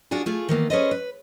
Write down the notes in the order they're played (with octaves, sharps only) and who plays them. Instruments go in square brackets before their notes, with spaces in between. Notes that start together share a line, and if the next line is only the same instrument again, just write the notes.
[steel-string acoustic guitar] D4 F4 F#4 G#4
A3 F4 G#4
D#3 E3 A#3 B3
C#4 G#4 A4 B4 C5 D#5
B4